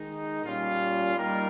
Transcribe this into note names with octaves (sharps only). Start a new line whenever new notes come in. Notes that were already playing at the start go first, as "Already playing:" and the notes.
Already playing: D#3 G#3 D#4
A#2 G3 C#4 F4
G3 A#3 D#4 A#4